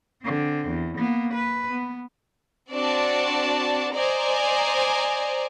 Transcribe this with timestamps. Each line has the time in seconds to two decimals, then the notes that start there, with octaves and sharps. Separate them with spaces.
0.23 D3 C4
0.69 E2
0.98 A#3 B3
1.34 B4
1.71 B3
2.72 C4 D4 F#4 D5 A5
3.94 C5 D5 D#5 G#5 A#5